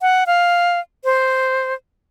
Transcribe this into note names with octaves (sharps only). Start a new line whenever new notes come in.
F#5
F5
C5